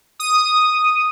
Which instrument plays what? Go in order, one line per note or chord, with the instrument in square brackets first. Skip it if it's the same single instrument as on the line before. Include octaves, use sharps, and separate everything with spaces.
[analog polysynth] D#6